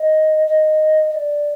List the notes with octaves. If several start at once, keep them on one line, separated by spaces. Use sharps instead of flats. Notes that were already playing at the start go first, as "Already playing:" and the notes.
Already playing: D#5
D#5
D#5
D5